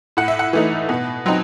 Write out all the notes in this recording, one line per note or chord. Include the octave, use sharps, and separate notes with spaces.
A2 F#5
E5
F#5
E3 A3 D#4
B2
F#3 C4 D#4